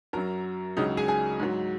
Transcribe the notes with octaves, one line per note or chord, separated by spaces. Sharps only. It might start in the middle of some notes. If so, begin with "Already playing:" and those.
F#2 F#3 A#4 A#5
C#2 C#3 F#3 D#4 D#5
G#4 G#5
G#4 G#5
G#2 F#3